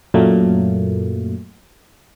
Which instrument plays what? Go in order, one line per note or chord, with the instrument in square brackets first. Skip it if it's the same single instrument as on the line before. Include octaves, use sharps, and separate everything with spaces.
[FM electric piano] F#2 A#2 F#3 A3 A#3